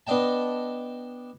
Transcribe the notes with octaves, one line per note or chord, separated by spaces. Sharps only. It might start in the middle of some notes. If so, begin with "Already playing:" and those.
B3 D4 D#5 G5 A5